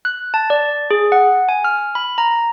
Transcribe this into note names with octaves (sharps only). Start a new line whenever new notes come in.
F#6
A5
D5
G#4
F#5
G#5
F6
B5
A#5